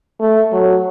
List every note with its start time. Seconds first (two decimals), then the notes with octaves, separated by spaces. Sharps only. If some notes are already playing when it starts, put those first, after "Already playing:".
0.20 A3
0.52 F#3